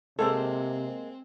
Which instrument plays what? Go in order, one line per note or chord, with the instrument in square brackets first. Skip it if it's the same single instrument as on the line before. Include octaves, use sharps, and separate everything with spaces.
[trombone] C3 [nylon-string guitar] G#3 A#3 C5 [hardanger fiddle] C4 [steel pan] A4